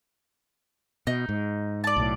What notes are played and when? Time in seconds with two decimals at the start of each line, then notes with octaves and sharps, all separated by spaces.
1.07 B2 D#4
1.29 G#2
1.84 D5 A5
1.97 B1 A2